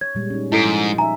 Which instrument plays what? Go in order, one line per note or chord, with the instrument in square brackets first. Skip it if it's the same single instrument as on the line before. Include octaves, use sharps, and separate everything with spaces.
[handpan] C#5 [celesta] G#6
[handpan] A#2 G3 G#3
C#4 D#4
[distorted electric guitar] G#2 [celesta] E4 A4 D7 [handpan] D#5
[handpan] F3
[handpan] D#4 E5 [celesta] G#5 A#5